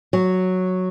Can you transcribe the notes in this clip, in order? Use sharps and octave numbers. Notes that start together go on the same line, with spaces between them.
F#3